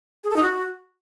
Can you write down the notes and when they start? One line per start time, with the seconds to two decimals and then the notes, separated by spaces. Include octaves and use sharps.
0.24 G#4
0.30 A4
0.36 D#4
0.43 F#4